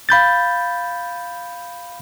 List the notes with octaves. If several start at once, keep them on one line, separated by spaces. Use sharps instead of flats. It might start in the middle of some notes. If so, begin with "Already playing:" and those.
F5 B5 G6 A6